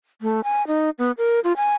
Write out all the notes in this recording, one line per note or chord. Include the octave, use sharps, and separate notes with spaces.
A3
G#5
D#4
B3
A#4
F4
G#5